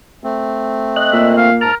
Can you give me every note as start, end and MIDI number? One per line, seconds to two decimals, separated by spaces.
0.24 1.50 57
0.24 1.50 60
0.96 1.36 75
0.96 1.36 90
1.12 1.64 46
1.12 1.64 58
1.12 1.31 76
1.37 1.54 77
1.61 1.72 44
1.61 1.74 70
1.61 1.75 81
1.61 1.75 89